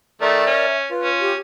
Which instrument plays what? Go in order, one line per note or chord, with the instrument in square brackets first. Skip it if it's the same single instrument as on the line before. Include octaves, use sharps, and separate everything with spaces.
[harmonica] D#3 A3 [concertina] A#4 D5 [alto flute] E5
[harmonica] C#4
[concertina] F4 [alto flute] B4
[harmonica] C#4
[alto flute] G4